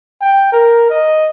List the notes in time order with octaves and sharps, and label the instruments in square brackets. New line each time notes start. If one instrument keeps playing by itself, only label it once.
[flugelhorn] G5
A#4
D#5